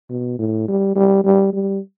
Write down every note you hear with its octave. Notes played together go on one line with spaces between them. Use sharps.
B2
A2
G3
G3
G3
G3